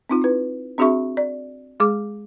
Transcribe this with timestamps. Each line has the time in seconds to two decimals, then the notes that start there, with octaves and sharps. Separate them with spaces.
0.10 C4 D#4 F4
0.22 E4 B4
0.78 C4 D4 F#4 G#4 E5 C#6
1.17 D5
1.80 G#3 G#4 D6